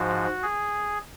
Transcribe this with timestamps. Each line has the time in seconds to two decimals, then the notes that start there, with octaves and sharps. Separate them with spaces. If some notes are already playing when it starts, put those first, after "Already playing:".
Already playing: G#2 F3 F#4
0.43 G#4